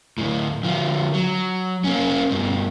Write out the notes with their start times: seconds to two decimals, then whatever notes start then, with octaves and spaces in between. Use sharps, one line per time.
0.18 D2 A2
0.63 D3 F3
1.14 F#3
1.84 A#3 C#4
2.31 G2 B2